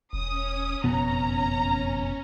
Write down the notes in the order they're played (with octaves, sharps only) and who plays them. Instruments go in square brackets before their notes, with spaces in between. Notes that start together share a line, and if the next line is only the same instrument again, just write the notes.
[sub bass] E1 [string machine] C#4 [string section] D#6
[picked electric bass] F#1 B2 B3 [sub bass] F2 [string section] A#5